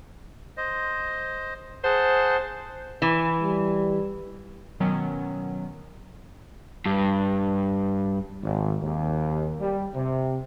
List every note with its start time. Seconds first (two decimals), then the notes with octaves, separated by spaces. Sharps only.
0.57 C5 D#5
1.84 G#4 C5 F#5 A5
3.02 E3
3.41 G3
4.80 B2 D#3 F#3 B3 C#4
6.86 G2
8.43 G#1
8.83 D#2
9.60 G3
9.95 C3